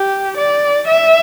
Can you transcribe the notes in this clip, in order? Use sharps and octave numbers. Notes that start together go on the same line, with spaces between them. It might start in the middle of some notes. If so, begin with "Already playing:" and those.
Already playing: G4
D5
E5